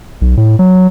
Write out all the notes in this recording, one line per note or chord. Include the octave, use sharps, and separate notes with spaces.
B1
A2
F#3